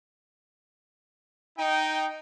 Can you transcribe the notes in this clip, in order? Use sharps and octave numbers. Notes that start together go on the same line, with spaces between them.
D#4 G5